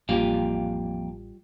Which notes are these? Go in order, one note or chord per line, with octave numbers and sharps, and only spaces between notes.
A1 F2 G3 A#3 F4 G4 F5